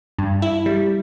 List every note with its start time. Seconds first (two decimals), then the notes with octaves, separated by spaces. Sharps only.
0.19 G2
0.42 E4
0.66 G3